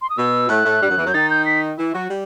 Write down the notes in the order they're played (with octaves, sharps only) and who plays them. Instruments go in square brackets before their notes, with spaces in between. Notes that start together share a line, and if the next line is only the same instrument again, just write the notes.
[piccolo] C6
D#6
[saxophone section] B2 [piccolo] E6
[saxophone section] A2 A3 [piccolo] F#6
[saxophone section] A2 A3
G2 G3
F#2 F#3
E2 E3
[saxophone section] F#2 F#3 [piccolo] G6
[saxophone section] D#3 D#4 [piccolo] A6
[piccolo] G6
B6
[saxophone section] E3 E4
F#3 F#4
G3